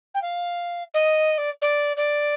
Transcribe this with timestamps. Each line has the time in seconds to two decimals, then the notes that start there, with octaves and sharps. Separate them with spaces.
0.14 G5
0.21 F5
0.93 D#5
1.37 D5
1.61 D5
1.96 D5